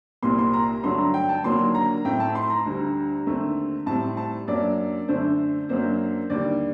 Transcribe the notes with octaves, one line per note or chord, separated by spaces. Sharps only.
C2 A#2 G3 A#3 C6
C6
A#5
G2 D3 F#3 A3 D4 C6
A#5
G5
A5
D#2 D3 F#3 A#3 D4 C6
A#5
A2 A3 C4 G5
A5
C6
A#5
D2 D3 G3
D#2 D3 A3 C4
A2 G3 C4 A5
A5
F#2 F#3 A#3 D4 D5
F#2 D3 A3 D4 C5
F#2 F#3 A#3 D4 C5
D#2 D3 G3 D5